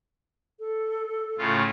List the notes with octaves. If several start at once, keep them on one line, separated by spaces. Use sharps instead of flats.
A4
A2 C#3 F4